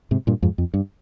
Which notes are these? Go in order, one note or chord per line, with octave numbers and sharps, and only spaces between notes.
G#2 C3
G2 A#2
F2 G#2
F2
G2